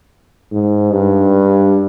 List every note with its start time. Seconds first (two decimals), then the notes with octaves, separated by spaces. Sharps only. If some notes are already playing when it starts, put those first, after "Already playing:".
0.52 G#2
0.93 G2